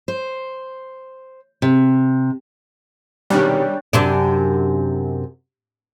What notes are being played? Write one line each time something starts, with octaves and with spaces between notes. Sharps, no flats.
C5
C3
E1 C3 D#3 G3 D4 C#5 G5
F#2 C3 D4